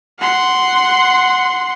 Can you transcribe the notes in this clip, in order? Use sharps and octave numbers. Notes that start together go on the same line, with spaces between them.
F#5 C6